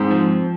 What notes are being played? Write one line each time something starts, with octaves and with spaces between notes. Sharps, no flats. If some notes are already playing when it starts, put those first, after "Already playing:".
Already playing: G#2 C4
F3